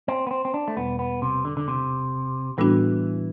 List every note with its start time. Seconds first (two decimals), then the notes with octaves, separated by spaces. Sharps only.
0.08 C4
0.27 B3
0.31 C4
0.45 C4
0.54 D4
0.68 A3
0.76 E2 B2 G3 B3
0.99 B3
1.22 C3
1.45 D3
1.57 D3
1.68 C3
2.58 A2 E3 G3 B3 D4 F#4